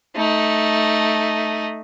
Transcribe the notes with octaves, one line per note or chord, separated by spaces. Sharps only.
A3 D#4